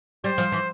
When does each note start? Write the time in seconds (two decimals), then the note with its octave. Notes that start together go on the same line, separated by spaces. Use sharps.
0.24 G3 C5
0.38 F3
0.52 E3